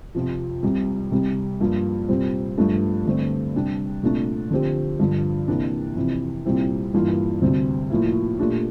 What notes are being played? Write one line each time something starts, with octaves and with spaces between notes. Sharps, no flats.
F2 C3 F3
C2 C3 G3
C2 C3 G3
G2 F3 A#3 F4
C2 A#2 G3 C4
G2 F3 A3 D4
G2 D3 A3 C4
C3 G3 D4
C2 A#2 A3 D4
D3 F3 C4 G4
G2 D3 F3
C3 E3 A#3 D4
F2 C3 E3
C2 A#2 G3 C4 E4
G2 E3 A#3 F4
D2 C3 G3 C4
A2 F3 A#3 E4
A#2 A3 D4 G4